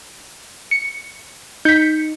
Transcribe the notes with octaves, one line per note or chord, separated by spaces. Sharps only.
C#7
D#4 G6 B6 C#7